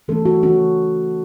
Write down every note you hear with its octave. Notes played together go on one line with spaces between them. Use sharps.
E3 A3 C#4 A4
F#4
E3 C#4 F#4